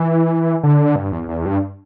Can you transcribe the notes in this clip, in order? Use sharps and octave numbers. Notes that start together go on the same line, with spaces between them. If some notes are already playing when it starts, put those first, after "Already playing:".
Already playing: E3
D3
G2
E2
E2
G2